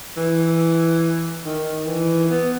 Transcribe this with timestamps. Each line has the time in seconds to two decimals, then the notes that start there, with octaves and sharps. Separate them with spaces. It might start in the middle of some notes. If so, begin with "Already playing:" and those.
0.17 E3
1.45 D#3
1.87 E3
2.30 B3